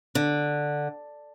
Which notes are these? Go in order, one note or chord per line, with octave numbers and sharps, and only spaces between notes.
D3